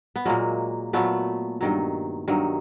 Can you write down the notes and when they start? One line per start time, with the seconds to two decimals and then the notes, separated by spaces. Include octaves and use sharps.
0.16 B3
0.25 A#2 F#3 G#3 A#3
0.93 A#2 F#3 A3 B3
1.61 G2 D#3 F#3
2.28 G2 D#3 F#3